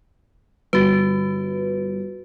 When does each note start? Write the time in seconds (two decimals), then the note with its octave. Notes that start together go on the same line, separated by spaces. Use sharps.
0.73 G1 F#4 B4